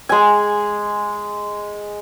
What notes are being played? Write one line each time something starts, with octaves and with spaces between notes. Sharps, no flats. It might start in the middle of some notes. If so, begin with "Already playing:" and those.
G#3 G#5